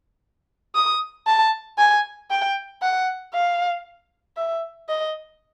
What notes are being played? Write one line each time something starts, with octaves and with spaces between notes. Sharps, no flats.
D#6
A5
G#5
G5
F#5
F5
E5
D#5